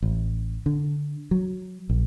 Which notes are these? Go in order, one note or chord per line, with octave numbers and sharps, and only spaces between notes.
A1
D3
F#3
A#1